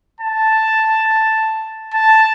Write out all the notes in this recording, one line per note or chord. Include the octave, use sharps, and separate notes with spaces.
A5
A5